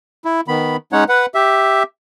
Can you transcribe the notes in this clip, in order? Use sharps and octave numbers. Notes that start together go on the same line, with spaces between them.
E4
D#3 B3 B5
G#3 C#4 D#4 C#5 F#5
B4 F#5
G4 E5